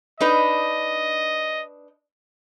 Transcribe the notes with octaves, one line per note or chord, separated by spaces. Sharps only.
D4 D#4 B4 D#5